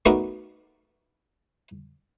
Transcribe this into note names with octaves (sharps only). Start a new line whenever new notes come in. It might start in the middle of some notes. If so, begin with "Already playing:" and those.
A3 B3 D4 D#4 F#4 A#4